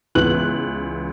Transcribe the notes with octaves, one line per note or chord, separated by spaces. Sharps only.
C#2 E3 B3 F#6 F#7